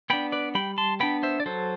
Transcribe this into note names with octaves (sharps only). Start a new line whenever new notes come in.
B3 D4 G5 B5
B4 D5
G3 G5 B5
A5 C6
B3 D4 G5 B5
C5 E5
D5
F#3 A4 C5